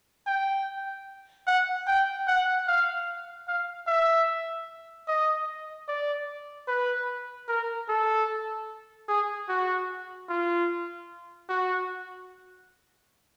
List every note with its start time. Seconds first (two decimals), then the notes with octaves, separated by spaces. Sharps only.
0.27 G5
1.47 F#5
1.87 G5
2.28 F#5
2.68 F5
3.48 F5
3.87 E5
5.08 D#5
5.88 D5
6.68 B4
7.48 A#4
7.89 A4
9.09 G#4
9.49 F#4
10.29 F4
11.49 F#4